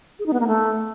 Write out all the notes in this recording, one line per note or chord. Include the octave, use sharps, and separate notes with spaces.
G#4
D#4
B3
A#3
A3